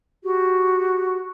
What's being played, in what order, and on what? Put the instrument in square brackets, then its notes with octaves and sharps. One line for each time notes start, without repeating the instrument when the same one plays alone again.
[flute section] F#4 G4